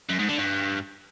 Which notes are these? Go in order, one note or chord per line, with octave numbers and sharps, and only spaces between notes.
F#2
G#2
D3
G2